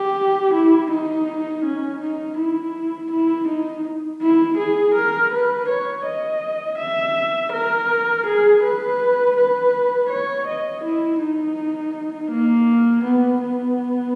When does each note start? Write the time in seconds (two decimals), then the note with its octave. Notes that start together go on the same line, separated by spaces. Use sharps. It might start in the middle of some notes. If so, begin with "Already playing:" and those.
Already playing: G4
0.54 E4
0.90 D#4
1.65 C#4
2.01 D#4
2.38 E4
3.11 E4
3.48 D#4
4.22 E4
4.58 G#4
4.95 A#4
5.32 B4
5.69 C#5
6.06 D#5
6.78 E5
7.53 A#4
8.26 G#4
8.62 B4
9.36 B4
10.10 C#5
10.47 D#5
10.84 E4
11.20 D#4
12.31 A#3
13.04 B3
13.41 B3